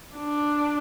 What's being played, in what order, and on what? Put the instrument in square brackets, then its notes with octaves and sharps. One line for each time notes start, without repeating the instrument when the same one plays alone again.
[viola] D4